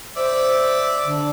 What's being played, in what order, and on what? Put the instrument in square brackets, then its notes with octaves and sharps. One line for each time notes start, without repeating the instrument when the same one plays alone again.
[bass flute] C5 [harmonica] D5 E5
[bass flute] D3